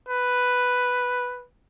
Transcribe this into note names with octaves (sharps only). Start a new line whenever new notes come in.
B4